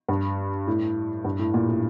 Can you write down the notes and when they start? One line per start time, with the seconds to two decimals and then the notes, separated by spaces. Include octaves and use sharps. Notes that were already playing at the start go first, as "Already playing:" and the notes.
0.08 G2
0.67 A2
1.24 G2
1.39 A2
1.54 A#2
1.68 A2